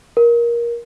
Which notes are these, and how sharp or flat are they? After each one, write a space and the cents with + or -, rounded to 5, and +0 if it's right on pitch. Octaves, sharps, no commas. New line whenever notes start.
A#4 +15